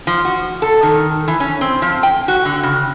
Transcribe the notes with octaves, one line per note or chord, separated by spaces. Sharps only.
F3
F#4
A4
D#3
E3
C#4
C4
F3
G5
F#4
D3
C#3